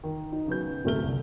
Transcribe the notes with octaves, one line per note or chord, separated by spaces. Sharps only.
D#3
D#4
C#3 F#3 B3 G6
D1 C3 A3 F6 G7
C2